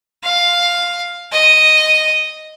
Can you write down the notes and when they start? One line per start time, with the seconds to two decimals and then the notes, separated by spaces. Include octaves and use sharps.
0.24 F5
1.32 D#5